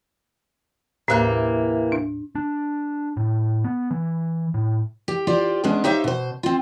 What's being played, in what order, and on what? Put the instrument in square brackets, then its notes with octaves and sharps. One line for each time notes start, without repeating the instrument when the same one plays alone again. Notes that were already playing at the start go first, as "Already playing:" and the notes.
[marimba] D#2 A2 [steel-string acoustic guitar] C3 E3 A#3
[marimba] D4
[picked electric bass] D4
A2
B3
E3
A2
[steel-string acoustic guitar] G4
F4 G4 C5 D5
G#3 B3 C#4 D4 G#4
D#4 G4 C5 C#5 E5 F5
B2 C5
C4 F4